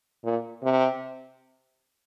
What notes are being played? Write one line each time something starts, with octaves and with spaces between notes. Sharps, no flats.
A#2
C3